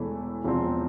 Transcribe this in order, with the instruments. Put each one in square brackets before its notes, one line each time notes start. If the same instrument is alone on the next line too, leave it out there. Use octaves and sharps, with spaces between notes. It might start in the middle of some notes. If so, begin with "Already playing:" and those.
Already playing: [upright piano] E1 E2 E3 A3 E4
E1 E2 C3 F3 C4